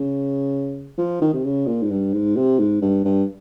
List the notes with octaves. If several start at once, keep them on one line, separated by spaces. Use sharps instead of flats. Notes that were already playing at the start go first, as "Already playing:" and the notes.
Already playing: C#3
F3
D#3
C3
C#3
A#2
G#2
G2
G#2
C3
G#2
G2
G2